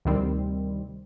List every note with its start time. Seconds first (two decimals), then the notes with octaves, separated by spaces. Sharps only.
0.05 D2 C3 D#3 G3 C4